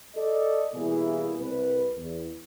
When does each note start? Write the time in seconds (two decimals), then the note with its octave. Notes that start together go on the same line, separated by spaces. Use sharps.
0.16 A4 D5 D#5
0.74 B2 E3 G3 A#3 E4 G#4
1.40 C2 B4
1.98 E2